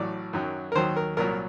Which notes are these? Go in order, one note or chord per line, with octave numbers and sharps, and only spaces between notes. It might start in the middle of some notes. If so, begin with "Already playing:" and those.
Already playing: A1 A2 F#3 D5
F#2 D#3 F#3
A#4
D#2 D#3 F#3 C5
A#4
C2 A#2 F#3 A#4